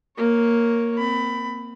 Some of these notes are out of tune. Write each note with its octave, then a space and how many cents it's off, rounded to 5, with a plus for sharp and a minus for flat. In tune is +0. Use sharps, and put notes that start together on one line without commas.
A#3 +0 C#5 +0
C4 -25 B5 +15